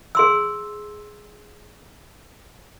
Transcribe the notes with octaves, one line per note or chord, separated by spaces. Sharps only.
G#4 C6 E6